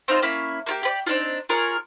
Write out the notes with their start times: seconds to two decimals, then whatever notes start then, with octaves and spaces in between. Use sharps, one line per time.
0.08 C4 D#4 F4 C5
0.22 A#3 C#4 E4
0.66 A#3 F4 G4
0.83 G4 B4 D5
1.06 C4 D4 D#4 F4
1.49 F4 G#4 A#4 C#5